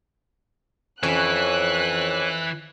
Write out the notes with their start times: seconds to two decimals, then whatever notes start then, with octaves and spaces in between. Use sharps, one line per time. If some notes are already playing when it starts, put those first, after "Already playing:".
1.03 F2 E3 C#4 F#6